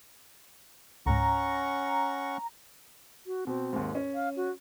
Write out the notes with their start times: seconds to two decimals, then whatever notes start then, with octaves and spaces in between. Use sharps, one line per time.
1.06 C#2 G#2 C#4 F#5 A#5 C#6
3.26 F#4
3.47 B2 C4
3.73 D#2 G#2
3.95 C#4
4.14 F5
4.37 F#4